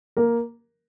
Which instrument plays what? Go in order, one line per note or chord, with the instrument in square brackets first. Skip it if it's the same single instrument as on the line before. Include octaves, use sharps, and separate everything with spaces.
[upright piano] A#3 A#4